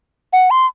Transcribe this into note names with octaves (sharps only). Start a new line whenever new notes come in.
F#5
C6